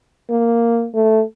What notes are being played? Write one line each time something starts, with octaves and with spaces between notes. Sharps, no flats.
A#3
A3